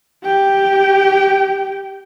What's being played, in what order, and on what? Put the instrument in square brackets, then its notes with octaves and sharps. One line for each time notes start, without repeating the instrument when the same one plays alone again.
[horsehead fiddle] G4 G5